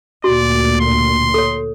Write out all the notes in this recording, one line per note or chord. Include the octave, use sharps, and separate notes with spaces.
D2 A#2 F#4 D5
C6
A4 C#5